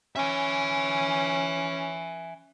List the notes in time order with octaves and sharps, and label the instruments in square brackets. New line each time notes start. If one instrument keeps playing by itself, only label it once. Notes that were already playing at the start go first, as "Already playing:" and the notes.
[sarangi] C#4 [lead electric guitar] E5 G#5